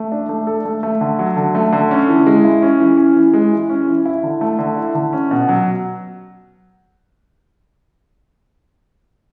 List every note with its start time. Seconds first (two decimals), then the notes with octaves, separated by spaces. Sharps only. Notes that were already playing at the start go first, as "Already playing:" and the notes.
Already playing: A3
0.12 D4
0.29 A3
0.47 A4
0.65 A3
0.83 A3
1.01 D3
1.19 F#3
1.36 D3
1.55 A3
1.72 D3
1.91 C#4
2.09 E3
2.26 G#3
2.44 E4
2.62 C#4
2.80 E3
2.98 C#4
3.16 E3
3.33 G#3
3.52 E3
3.69 C#4
3.88 E3
4.06 E4
4.23 D3
4.41 A3
4.59 D3
4.77 E4
4.95 D3
5.13 C#4
5.31 B2
5.49 F#3